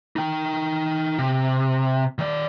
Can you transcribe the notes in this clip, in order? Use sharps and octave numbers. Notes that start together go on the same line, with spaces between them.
D#4 G5
C3
D#3 D5